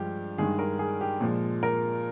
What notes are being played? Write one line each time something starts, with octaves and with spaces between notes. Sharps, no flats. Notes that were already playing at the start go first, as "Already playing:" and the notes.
Already playing: G2 F3 G#3 G4
G2 D#3 G#3 G#4
A#4
G#4
G4
A#2 F3 G#3
A#4